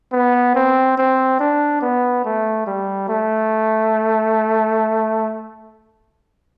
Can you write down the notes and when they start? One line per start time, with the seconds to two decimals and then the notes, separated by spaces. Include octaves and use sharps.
0.12 B3
0.55 C4
0.98 C4
1.39 D4
1.82 B3
2.25 A3
2.66 G3
3.08 A3